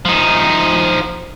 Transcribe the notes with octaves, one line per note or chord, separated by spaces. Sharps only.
F3 D#4